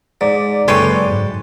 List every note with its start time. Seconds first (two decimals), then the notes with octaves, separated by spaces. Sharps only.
0.21 G#2 D5
0.68 F#1 G#3 A4 B4 C#5 G5
1.11 G#2